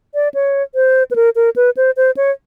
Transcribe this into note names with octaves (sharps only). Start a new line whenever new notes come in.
D5
C#5
C5
B4
A#4
A#4
B4
C5
C5
C#5